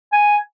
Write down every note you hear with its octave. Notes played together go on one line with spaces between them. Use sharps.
G#5